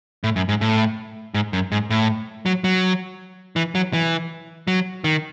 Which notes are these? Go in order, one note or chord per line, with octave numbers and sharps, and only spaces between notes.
A2
F#2
G#2
A2
G#2
F#2
G#2
A2
F#3
F#3
E3
F#3
E3
F#3
D#3